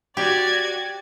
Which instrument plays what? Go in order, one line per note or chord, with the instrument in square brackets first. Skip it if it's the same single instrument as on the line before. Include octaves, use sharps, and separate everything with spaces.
[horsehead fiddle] F#4 [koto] G4 [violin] D5 G#6